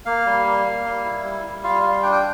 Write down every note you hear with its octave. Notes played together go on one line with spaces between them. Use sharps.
A#3 F5
G3
A#3
A#3
G3
E4
G3
G3
F4 F5
G3 F5
D4 G5
G5